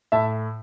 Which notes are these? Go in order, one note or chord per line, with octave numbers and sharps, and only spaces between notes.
A2 E5 A5